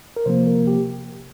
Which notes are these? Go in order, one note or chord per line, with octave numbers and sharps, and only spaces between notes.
A#4
C3 F3 A#3 C5
A#4
G4